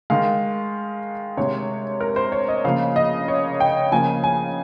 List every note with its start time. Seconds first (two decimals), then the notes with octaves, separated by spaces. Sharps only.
0.10 D#3 G#3 F5
1.37 C3 D#3 G#3 C#5
2.01 A#4
2.16 C5
2.32 C#5
2.48 D#5
2.64 C#3 F3 A#3 F5
2.96 D#5
3.28 C#5
3.60 G5
3.92 C#3 F3 A#3 G#5
4.24 G#5